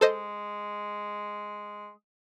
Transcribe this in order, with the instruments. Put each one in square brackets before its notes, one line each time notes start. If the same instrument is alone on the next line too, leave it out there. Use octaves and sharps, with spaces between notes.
[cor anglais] G#3 [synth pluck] A4 C5 D#5